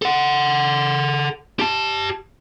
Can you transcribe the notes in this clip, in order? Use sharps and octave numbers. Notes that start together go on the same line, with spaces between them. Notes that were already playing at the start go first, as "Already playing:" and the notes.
A4 F#5
G4 A5